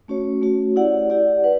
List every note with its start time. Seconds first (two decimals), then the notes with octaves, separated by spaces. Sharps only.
0.08 A3 C#4 F#4 C#5
0.42 A3 C#4 F#4 C#5
0.76 E4 G4 D5 F#5
1.10 E4 G4 D5 F#5
1.44 B4 F#5